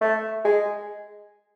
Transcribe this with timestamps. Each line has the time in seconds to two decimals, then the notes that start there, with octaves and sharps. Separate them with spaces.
0.01 A3
0.44 G#3